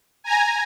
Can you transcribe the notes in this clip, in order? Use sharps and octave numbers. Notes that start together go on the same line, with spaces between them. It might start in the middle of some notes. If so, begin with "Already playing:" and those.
G#5 A#5